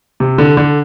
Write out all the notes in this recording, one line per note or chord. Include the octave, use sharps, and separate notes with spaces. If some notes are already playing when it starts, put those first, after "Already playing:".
C3
D3
D3